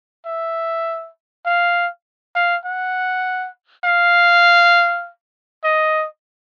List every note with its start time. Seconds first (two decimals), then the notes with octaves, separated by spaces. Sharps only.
0.26 E5
1.46 F5
2.35 F5
2.65 F#5
3.84 F5
5.64 D#5